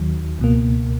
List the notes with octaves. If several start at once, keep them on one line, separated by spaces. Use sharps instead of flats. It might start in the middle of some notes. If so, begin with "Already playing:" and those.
Already playing: D#2 D#3 F#3
C#2 B2 A#3